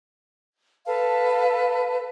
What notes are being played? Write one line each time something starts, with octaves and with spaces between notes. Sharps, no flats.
A4 B4 F5 A5